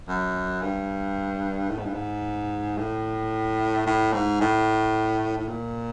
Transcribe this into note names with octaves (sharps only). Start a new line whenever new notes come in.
F#2
G2
A2
G#2
G2
G#2
A2
A2
G#2
A2
A2
A#2